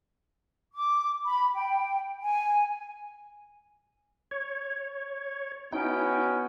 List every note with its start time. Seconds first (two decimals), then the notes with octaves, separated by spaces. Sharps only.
0.74 D6
1.25 B5
1.54 G5
2.20 G#5
4.31 C#5
5.73 B3 C#4 D#4 E4 F#4 G5